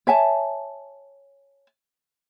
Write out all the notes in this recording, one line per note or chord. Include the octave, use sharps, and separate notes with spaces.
C#5 E5 G#5 A5